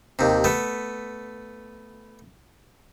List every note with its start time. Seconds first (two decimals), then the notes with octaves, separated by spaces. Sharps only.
0.19 D#2 C3
0.44 A3 B3